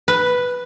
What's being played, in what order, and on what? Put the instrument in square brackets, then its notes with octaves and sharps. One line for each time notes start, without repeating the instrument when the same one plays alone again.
[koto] B4